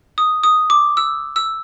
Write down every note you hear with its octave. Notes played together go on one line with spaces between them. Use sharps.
D#6
D#6
D6
E6
E6